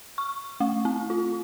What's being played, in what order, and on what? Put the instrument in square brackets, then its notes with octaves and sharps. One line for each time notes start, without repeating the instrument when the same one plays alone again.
[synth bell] C#6
A3
C4
F4